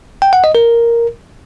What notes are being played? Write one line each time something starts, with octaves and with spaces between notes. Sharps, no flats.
G5
F#5
D#5
A#4